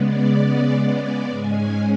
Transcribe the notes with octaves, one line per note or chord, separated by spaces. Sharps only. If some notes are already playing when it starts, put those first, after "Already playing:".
Already playing: C#3 G#3 B3 D5
D5
G#2 G#3 C#4 G#5